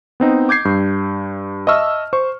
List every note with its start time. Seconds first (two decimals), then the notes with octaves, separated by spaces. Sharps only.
0.20 B3 C4 D#4
0.49 D6 G6 G#6 C7
0.65 G2
1.67 D#5 E5 A5 C#6 E6 F6
2.13 C5 C#6